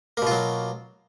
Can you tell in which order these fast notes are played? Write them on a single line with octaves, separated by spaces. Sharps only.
A#3 B2 F4 F#3